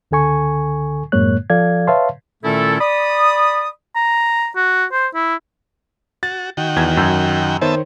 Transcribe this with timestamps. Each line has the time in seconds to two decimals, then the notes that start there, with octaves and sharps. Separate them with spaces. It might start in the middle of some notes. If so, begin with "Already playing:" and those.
0.11 C#2 D3 A4 G#5 C#6
1.12 F#2 A2 G#3 A#3 C#5 F#6
1.50 F3 A4 D5 F5 G#6
1.87 B4 C#5 E5 F5 A5 C6
2.44 A#2 D#3 A3 C#4 E4 A4
2.80 D5 B5 D#6
3.95 A#5
4.56 F#4
4.92 C5
5.15 E4
6.23 F#4 A6
6.57 D#3 F#4 G5
6.76 E2 F6 G#6
6.97 F#2 E6 G6
7.61 D#3 B3 C5 C#5 E5 A5